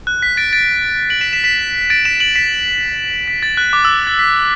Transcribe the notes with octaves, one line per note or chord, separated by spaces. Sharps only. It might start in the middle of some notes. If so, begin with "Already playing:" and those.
F#6
B6
A6 D7
A6 D7
D7 F#7
B6 E7
B6 E7
B6 E7
A6 D7
B6 E7
E7
D7 F#7
B6 E7
B6
A6
F#6
D6
E6
A6
B6